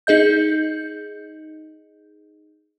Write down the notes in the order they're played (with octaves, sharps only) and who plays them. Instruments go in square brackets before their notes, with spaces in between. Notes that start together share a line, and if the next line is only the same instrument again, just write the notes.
[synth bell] D#4 G#4 D#5 G6